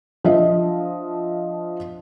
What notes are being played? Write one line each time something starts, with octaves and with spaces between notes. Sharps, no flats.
F3 D4 D#5 E5